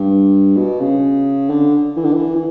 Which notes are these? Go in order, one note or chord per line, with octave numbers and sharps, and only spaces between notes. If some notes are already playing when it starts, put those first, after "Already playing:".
Already playing: G2
B2
C#3
D3
E3
D3
E3
E3